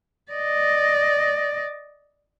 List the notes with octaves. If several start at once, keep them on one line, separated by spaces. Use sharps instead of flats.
D5 D#5